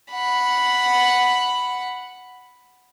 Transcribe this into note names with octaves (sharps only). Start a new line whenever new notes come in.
F#5 B5